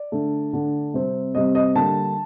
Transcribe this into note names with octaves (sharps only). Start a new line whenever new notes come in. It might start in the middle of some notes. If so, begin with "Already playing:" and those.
Already playing: D5
D3 A3 D4
D3 A3 D4
C3 G3 C4
C3 G3 C4 D#5
D#5
D3 G3 A#3 D4 A5